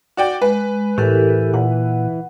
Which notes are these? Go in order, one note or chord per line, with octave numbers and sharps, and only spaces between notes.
F#4 D5 G5
G#3 B4
A2 E3 G4 A4 A#4
A#2 F#5